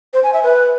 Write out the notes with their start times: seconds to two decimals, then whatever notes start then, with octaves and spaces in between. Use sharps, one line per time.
0.13 C5
0.23 G#5
0.33 E5
0.43 B4